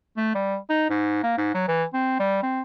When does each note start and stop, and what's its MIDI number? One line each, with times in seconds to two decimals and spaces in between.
0.17 0.33 57
0.35 0.57 55
0.70 0.85 63
0.90 1.23 44
1.23 1.35 58
1.38 1.53 44
1.55 1.65 54
1.68 1.84 52
1.94 2.17 60
2.20 2.42 55
2.43 2.62 60